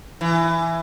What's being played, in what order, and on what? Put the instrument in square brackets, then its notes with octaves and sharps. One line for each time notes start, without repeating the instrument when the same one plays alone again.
[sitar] E3